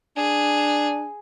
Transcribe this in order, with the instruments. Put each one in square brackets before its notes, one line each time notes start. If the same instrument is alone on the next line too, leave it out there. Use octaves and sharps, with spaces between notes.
[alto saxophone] D4 [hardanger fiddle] G#4